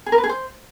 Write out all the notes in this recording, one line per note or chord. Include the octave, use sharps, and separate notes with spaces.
G#4
A#4
B4
G#4
C5